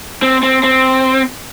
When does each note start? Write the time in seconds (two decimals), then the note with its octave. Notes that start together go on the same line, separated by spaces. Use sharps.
0.22 C4
0.43 C4
0.63 C4